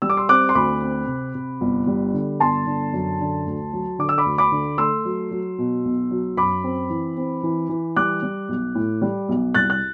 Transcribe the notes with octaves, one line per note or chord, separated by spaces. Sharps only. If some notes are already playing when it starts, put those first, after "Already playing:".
G3 E6
D6
C6 E6
C4 D6 F#6
C6
D2 B5 D6
C4
C3
C3
G1
G3
D3
G1 A5 C6
D3
F#2
D3
D2
F#3
D3 D6
E6
B5 D6
D2
B5 D6
D3
A3 C6 E6
F#3
F#3
B2
B1
F#3
F#2 B5 D6
C4
E3
C4
E3
E3
G3 D6 F#6
G3
B1
A2
G3
B1
C2 F#6 A6
F#6